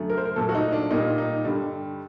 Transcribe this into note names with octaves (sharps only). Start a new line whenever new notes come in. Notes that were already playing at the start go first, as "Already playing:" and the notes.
Already playing: F#2 D3 A3
A#4
C5
A#4
A#2 F#3 A3 A4
F#4
D#4
D4
A#2 G3 A#3 D#4
D#4
G2 D3 G3